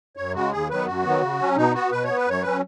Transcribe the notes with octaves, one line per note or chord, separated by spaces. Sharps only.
F#2 C#5
C#3 G#3 F#4
D#2 G#4
D#3 F#3 B3 B4
F#2 F#4
D#3 F#3 B3
C#3
F#3 C#4
B2 D#4
B3 F#4
B2 B4
B3 C#5
B4
F#2 C#5
F#3 C#4 B4